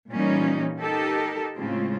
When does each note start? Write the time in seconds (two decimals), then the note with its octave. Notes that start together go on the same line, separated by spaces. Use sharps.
0.10 A#2 E3 G3 A#3 C#4 D#4
0.80 D#4 G4 A4 A#4
1.55 A2 C#3 G#3 C4 F4